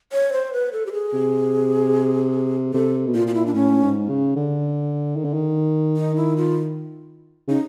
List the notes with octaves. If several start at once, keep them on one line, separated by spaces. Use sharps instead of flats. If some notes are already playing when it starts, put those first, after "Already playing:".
C#5
C5
B4
A4
G4
G#4
C3
C3 A4
B2
A#2 F4
F4
E4
D4
A2 C#4
G#2
C#3
D3
D#3
D3
D#3
D#4
E4
F4
C#3 D#4